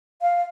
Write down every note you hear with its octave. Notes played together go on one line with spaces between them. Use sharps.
F5